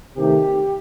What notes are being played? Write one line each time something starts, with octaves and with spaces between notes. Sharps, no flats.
C3 D#3 A3 D#4 G4